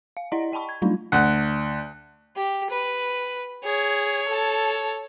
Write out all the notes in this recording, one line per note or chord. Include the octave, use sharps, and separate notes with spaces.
F5
E4 D5 D#5 F#5 A#5
D#5 G5 A5 B5 C#6
G#6
F#3 G3 A3 D4 D#4 F4
D2 F#5
G4
B4
G#4 C#5
A4 A5